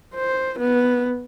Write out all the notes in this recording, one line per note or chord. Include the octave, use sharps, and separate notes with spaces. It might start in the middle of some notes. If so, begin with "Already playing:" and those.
C5
B3